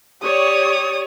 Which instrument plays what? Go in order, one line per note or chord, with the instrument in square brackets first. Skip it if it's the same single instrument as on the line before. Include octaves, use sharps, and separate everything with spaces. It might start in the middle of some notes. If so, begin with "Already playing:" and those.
[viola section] G4 C#5 D5 [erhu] D#6